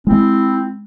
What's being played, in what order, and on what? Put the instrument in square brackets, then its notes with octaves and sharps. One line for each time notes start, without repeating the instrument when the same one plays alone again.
[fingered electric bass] G#3 [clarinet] C4 [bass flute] E4